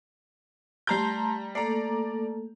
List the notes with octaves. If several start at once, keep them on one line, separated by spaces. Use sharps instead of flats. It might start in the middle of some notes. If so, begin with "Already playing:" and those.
G3 A3 A5 A#5 C6 G6
A3 A#3 A4 D5 A#5